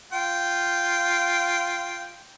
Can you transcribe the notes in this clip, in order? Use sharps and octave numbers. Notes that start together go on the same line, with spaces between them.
F4 G5